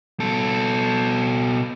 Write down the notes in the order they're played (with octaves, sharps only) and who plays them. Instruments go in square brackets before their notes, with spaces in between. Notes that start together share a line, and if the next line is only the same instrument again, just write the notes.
[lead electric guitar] B2 A4